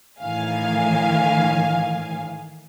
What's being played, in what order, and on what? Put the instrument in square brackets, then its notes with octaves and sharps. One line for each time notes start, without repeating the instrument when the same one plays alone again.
[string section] A2 D#3 E3 F5 G#5